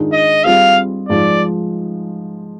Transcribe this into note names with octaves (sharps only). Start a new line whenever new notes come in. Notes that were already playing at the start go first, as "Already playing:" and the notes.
Already playing: G#2 D#3 G#3 D4 F4
D#5
G3 C4 F4 G#4 F5
G#2 F3 G#3 D5